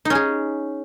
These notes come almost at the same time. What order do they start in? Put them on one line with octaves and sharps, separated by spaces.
D#4 C#4 G#4